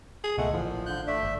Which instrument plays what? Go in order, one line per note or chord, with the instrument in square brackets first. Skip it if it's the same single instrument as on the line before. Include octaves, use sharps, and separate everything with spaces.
[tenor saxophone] G#4
[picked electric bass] C#2 B2 [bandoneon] G#3 F#5 [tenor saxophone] A3
[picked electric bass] A1 E3 [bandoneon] A#2 [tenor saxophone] F3
[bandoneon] D3 F#6 G6
[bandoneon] A3 E5 [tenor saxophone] D4
[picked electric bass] G1